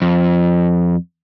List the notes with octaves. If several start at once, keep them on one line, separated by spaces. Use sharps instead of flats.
F2